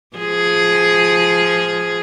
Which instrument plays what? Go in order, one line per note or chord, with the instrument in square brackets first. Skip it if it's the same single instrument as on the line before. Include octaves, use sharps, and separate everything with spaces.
[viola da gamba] F3 G#4